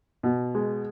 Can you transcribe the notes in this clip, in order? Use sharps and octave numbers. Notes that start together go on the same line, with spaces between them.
B2
G#3